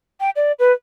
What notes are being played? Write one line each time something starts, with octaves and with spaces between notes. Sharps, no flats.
G5
D5
B4